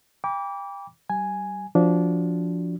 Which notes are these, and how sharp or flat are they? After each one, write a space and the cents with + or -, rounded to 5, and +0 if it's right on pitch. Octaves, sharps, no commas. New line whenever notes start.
G5 +30 B5 -35 D6 -25
G3 -30 G#5 +0
F3 -5 D4 -20 F#4 +0